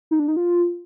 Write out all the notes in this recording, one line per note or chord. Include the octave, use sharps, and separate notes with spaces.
D#4
D4
D#4
F4